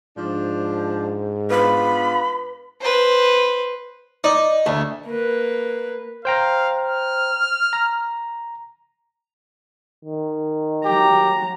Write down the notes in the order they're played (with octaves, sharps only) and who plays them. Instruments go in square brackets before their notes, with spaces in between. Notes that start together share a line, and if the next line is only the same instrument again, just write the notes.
[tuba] G#2 [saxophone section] F3 D4
[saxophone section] B3 D4 F4 [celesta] B4 [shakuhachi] B5
[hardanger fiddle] B4 C5
[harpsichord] D#4 [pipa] D5
[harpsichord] D2 [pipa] A3
[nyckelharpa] A#3 B4
[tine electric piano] C5 G5 A#5 [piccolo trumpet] F5
[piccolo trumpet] F6
[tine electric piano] A#5
[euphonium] D#3
[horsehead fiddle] F#3 A#5 [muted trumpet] G4